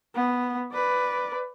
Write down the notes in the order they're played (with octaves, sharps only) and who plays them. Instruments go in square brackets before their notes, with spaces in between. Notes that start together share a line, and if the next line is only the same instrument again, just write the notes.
[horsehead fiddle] B3
B4 D5